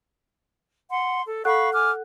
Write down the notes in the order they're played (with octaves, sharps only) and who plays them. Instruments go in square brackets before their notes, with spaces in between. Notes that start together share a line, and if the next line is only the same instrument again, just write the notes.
[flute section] F#5 C6
A4
[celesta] A4 F#5 F#6 [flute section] F5 B5 C#6
[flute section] G#5 D6 F6